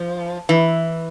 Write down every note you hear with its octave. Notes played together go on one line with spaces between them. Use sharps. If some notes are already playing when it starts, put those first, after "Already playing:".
Already playing: F3
E3